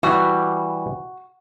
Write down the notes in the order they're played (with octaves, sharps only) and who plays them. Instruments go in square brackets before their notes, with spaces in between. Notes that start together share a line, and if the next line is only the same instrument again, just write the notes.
[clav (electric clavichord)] E3 G3 [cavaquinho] F#4